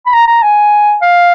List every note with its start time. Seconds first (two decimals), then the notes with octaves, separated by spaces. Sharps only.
0.06 B5
0.13 A#5
0.28 A#5
0.43 G#5
1.02 F5